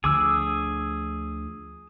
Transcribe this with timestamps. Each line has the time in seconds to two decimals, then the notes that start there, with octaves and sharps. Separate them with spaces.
0.04 D2 D3 F3 G#4 D6 E6